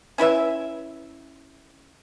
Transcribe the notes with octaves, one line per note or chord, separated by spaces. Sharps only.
C#4 E4 B4 E5